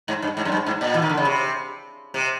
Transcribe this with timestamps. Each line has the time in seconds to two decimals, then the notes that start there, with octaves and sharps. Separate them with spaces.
0.08 G#2
0.22 G2
0.37 G#2
0.45 F#2
0.52 G2
0.66 G#2
0.81 A#2
0.94 E3
1.02 D#3
1.09 D3
1.17 C#3
1.25 C3
2.14 C3